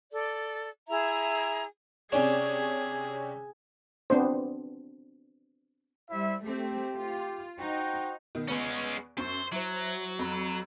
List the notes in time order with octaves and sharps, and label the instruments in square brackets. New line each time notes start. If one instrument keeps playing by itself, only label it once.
[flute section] A4 D5
E4 G#4 E5 A#5
[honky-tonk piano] C3 C#4 C#5 [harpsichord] D4 [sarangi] G#4
[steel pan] B3 C4 D4 C5
[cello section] G3 [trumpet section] E4 C5 E5
[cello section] A3 C4 [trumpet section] G4
[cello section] F4
[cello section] D#4 [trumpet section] F#4 C5 G5
[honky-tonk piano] B2 D#3
[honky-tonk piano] E2 B3 C#6 [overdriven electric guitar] G#3 C#4
[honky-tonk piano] F#2 C#6 [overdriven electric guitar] C5
[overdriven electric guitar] F#3 [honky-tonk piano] E4 C5
[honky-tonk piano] F2 B5